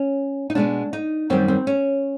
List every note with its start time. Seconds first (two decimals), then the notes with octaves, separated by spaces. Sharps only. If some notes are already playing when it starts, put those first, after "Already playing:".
Already playing: C#4
0.50 D#4
0.55 B2 G#3 B3 D4
0.93 D#4
1.30 F#2 D#3 G3 C4
1.48 C4
1.67 C#4